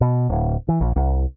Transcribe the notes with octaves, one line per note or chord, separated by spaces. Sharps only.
B2
D1
E3
A#1
C2